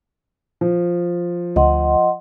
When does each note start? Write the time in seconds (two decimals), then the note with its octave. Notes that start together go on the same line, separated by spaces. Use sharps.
0.61 F3
1.56 D2 D#5 F#5 C6